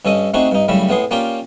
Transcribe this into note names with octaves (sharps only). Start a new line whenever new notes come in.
G2 C#4 A4 D#5 D#6
A3 C4 D4 D#4 F#4 G#4
G2 D#4
F#2 C#3 G3 A3 E4
A2 B3 G#4 C6
A#3 C#4 F4 G4 D5